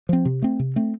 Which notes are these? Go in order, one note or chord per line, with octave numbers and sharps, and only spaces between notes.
F3 C4
C3
A3 C4
C3
A3 C4